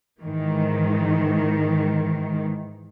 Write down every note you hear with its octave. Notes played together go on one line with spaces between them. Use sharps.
G#2 D#3 E3